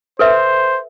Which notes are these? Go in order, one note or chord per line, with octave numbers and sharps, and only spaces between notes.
A4 B4 C5 E5